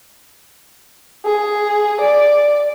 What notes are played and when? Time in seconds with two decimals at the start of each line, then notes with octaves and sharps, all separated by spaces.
1.25 G#4
2.01 D5